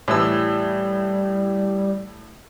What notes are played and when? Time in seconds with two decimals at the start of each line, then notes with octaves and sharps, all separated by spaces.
0.08 A2 E3 G3 E6